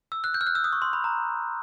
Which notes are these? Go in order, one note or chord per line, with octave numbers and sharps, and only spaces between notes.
E6
F#6
G6
F6
F#6
E6
D#6
C#6
C6
B5
A#5